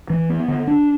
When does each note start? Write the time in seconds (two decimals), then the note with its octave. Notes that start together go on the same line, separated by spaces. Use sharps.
0.10 E3
0.29 B3
0.48 D3
0.67 D4